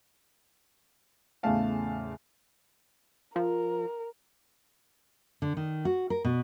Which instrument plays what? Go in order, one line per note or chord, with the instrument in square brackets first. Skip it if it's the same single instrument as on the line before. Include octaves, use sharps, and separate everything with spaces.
[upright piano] E2 A2 C#3 A3 F5 A5
[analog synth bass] F3 [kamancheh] A#4
[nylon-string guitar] D3
D#3
F#4
A#4
B2